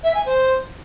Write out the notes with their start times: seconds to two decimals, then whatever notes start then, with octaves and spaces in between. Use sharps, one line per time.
0.04 E5
0.15 G#5
0.26 C5